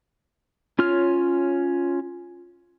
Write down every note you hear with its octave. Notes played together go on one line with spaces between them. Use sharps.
C#4 F4 C#5 F6